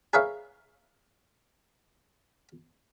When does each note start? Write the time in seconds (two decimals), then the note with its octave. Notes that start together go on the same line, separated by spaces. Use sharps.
0.13 G#4 A#4 B4 C#5 E5 F5